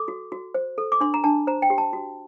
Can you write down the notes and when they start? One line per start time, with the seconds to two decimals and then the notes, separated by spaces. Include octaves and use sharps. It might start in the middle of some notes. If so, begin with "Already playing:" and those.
Already playing: A4 D6
0.08 F#4
0.32 F#4
0.54 C5
0.78 A4
0.92 D6
1.01 D4 C6
1.14 A#5
1.24 D4 A5
1.47 C5 A#5
1.62 G5
1.70 G4
1.78 A5
1.93 F#4